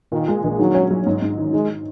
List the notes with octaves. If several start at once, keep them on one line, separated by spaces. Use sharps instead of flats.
A#2 D#3
G#3
A#1
D#3 F#3
C#4
F#3
G#2
G#2
D#3
D#3 G#3